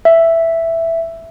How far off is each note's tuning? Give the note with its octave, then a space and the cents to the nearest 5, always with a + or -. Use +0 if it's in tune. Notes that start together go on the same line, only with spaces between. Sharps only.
E5 +5